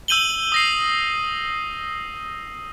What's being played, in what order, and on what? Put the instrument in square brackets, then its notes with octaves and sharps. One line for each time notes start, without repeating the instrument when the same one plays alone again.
[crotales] E6 G6 D#7 F#7 G7
D#6 A#6 C7